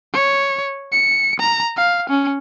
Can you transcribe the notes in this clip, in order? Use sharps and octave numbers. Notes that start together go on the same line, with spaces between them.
C#5
C#7
A#5
F5
C#4